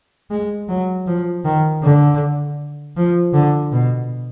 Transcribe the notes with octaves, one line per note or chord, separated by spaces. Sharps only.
G#3
F#3
F3
D#3
D3
F3
D3
B2